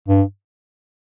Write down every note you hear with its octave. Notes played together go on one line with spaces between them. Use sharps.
G2